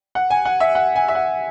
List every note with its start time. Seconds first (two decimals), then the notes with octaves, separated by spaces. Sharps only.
0.15 F#5
0.30 G#5
0.45 F#5
0.60 E5
0.75 F#5
0.96 G#5
1.08 E5
1.15 F#5